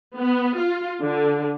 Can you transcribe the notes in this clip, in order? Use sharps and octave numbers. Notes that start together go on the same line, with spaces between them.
B3
F4
D3